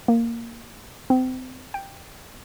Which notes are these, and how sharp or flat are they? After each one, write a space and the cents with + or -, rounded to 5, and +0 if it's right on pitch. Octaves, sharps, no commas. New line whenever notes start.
A#3 -5
C4 -30
G5 +5